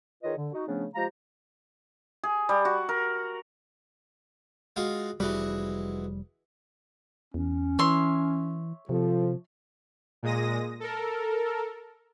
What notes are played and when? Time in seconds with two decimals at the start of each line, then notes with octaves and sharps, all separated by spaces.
0.23 D#3 F4 G#4 B4 C#5 D#5
0.36 D3
0.53 D#4 F#4
0.67 C#3 F3 A3 B3 C#4 D4
0.95 F3 G#3 G4 F5 A#5
2.24 G#4
2.49 G3
2.65 F#4
2.89 A#4
4.76 G#3 F4 F#4
5.20 F1 E3 G3 G#3 F#4
7.34 E2 C#4
7.79 E3 C#5 E5 C6
8.89 C3 F3 A4
10.23 A#2 G#3 D#6 A#6
10.80 A4 A#4